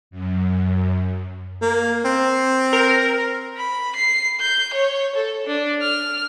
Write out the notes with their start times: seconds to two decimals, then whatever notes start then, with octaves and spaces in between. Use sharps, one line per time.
0.11 F#2
1.62 A#3
2.05 C4
2.73 A#4
3.57 B5
3.95 C7
4.40 G6
4.74 C#5
5.15 A4
5.47 D4
5.82 F6